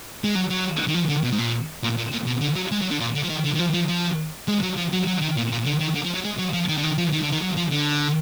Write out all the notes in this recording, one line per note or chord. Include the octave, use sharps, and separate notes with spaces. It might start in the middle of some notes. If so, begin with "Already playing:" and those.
G#3
F#3
F#3
D#3
F3
D3
B2
G#2
A#2
A#2
A#2
A#2
B2
D3
F#3
G#3
F#3
D3
A#2
D3
F3
D#3
D3
D#3
F3
F3
F3
G#3
F#3
F3
F#3
F#3
D#3
A#2
A#2
D3
D#3
D3
F3
F#3
G#3
F#3
F3
D#3
D3
D#3
F3
D#3
D3
D#3
F#3
F3
D3